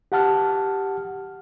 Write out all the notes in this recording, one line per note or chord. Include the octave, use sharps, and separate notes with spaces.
G4 F#5 A5 F6